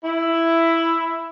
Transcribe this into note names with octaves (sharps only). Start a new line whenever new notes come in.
E4